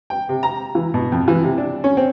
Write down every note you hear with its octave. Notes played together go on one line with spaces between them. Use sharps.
G5
C3
A#5
E3
B2
F2
E3
C3
D4
C#4
C4